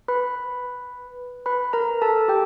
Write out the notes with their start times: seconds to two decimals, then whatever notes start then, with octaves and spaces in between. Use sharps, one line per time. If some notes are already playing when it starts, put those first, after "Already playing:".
0.08 B4 B5
1.46 B4 B5
1.73 A#4 A#5
2.02 A4 A5
2.28 G4 G5